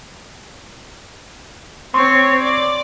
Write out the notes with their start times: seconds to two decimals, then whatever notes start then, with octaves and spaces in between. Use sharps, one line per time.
1.94 C4 C#5 C6 C#6
2.41 D5